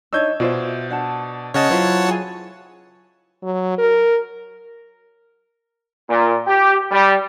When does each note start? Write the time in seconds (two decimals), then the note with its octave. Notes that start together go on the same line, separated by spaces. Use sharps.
0.13 D4 D#4 C#5 E6 G6 G#6
0.40 B2 F4 C5 D5 E5
0.90 D4 F#5 A5
1.54 C#3 C#4 C#5 D#5 F#5 A5
1.70 F#3 E4 F4 B4 C5
2.08 G#4 G#5
3.43 F#3
3.78 A#4
6.09 A#2
6.47 G4
6.91 G3